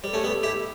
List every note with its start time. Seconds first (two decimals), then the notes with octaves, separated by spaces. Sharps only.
0.03 G3 C#5
0.07 A4
0.13 A3 C#4
0.23 G3 B3
0.43 E4 G4